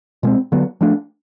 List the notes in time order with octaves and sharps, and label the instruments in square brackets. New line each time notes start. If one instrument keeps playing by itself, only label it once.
[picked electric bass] B2 G#3 C4
D3 F#3 B3
F3 A3 D4